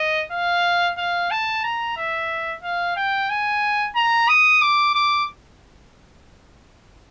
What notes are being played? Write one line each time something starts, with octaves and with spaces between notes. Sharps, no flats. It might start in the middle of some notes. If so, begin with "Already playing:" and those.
Already playing: D#5
F5
F5
A5
A#5
E5
F5
G5
G#5
A#5
D#6
D6
D6